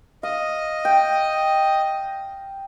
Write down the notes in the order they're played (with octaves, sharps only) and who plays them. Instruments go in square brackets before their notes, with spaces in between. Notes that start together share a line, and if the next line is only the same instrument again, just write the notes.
[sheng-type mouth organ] D#5 [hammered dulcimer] F5
[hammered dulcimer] G5